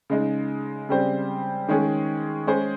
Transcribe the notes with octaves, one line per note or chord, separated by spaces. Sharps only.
C#3 G#3 D#4
C#3 G3 C4 G4 C5
D#3 G#3 C#4 G#4
G#3 C#4 G#4 C5